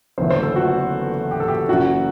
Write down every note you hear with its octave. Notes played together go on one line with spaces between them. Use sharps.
F#1 E2 D3 A3 E4 C5
C5
A4
F#4
G4
A4
G4
F#1 F#2 E3 F#4